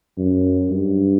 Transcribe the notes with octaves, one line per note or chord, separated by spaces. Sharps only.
F#2
G2